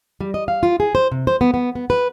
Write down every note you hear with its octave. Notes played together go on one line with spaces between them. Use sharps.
G3
D#5
F5
F4
G#4
C5
C3
C5
B3
B3
B3
B4